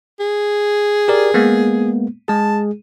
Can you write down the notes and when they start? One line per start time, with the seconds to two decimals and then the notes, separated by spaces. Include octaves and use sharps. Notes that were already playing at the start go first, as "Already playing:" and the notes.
0.20 G#4
1.08 G4 A#4 D5
1.34 G#3 A#3 B3
2.28 G#3 G#4 A5